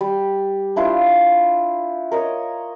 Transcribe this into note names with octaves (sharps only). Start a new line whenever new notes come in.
G3
D4 E4 F4 C5
A#4 C#5 D#5